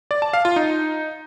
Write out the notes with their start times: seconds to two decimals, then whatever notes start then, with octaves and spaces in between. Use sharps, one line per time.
0.11 D5
0.22 A5
0.33 F5
0.45 F4
0.56 D#4